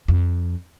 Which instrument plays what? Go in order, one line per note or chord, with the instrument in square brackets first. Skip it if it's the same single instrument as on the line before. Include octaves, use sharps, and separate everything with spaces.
[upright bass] F2